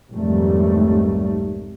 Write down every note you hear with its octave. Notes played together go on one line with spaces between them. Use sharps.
F1 B1 G#2 D#3 G3 A3